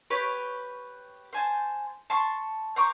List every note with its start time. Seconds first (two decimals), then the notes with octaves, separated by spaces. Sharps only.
0.10 G4 B4 C#5
1.33 C5 G#5 A5
2.10 A5 C6 C#6
2.76 C5 A#5 C#6 D6